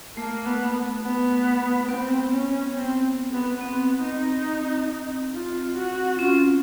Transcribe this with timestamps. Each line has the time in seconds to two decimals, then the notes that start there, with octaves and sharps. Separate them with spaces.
0.17 A3 A#3
0.45 B3
1.03 B3
1.88 B3 C4
2.32 C#4
2.75 C4
3.32 B3
3.61 B3 C4
4.03 D#4
5.33 F4
5.76 F#4
6.19 C#4 F4